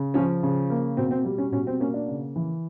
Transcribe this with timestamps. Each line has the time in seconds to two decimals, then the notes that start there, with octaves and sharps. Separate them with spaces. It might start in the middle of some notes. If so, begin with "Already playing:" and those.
Already playing: C#3
0.14 F3 C#4
0.43 C#3
0.70 A#3
0.97 B2 C4
1.11 C4
1.25 G3
1.38 C#4
1.52 B2 C#4
1.67 C4
1.80 A#3 C#4
1.94 D4
2.08 C#3
2.36 E3